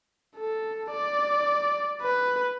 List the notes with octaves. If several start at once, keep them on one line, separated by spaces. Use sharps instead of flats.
A4
D5
B4